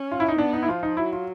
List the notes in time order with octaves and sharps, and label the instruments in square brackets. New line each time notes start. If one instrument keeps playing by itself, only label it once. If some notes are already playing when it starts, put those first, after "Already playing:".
Already playing: [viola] C#4
[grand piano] F4
E4
D#4
[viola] B3 [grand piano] D4
[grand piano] D#4
E4
[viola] F3 [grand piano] F4
[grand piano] D#4
[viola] F#3 [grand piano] E4
[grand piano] F4